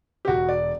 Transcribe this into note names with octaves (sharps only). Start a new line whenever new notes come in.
G4
E1 F#4
D5